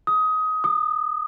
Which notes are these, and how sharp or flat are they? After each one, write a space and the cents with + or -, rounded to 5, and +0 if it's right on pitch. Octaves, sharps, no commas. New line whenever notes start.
D#6 +20
D#6 -35